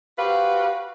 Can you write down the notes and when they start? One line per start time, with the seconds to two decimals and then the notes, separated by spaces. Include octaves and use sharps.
0.17 F#4 G4 B4 C5 F5